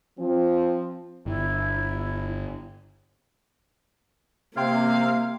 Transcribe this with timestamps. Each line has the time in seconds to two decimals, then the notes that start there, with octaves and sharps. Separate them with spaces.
0.19 F3 C4
1.26 G1 E4
4.57 C3 A#3 F5 G5 C6 G#6